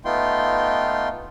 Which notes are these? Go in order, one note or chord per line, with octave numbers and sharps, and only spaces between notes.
A3 B3 D#4 F4 G5 C6